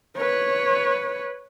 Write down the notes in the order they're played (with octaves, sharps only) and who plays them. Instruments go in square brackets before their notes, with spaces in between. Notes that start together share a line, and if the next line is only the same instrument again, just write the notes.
[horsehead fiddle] B4 C#5